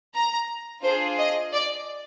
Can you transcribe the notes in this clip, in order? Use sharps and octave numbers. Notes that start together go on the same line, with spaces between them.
A#5
D4 F4 G#4 C5
D#5
D5